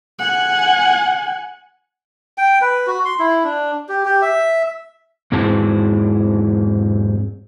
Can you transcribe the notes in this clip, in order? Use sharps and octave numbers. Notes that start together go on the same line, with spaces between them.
F#5 G#5
G5
B4
F#4
C6
E4
D4
G4
G4
E5
E2 G#2 E3 G#3 C4 A5